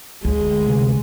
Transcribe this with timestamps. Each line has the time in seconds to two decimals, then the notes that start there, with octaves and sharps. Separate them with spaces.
0.25 D2 G#3
0.67 C3